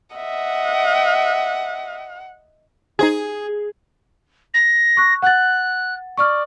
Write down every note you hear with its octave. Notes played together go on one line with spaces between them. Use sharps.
D#5 E5 F#5
D#4 G#4 C5 G#5
A#6
C#6 F#6
F#5 F#6 A6
D5 C#6 F6